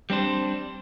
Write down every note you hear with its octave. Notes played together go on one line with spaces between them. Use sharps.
G3 C4 D4 C5